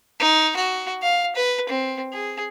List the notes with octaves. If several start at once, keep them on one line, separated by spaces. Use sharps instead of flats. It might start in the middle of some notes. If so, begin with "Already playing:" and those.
D#4
F#4
F5
B4
C4
G#4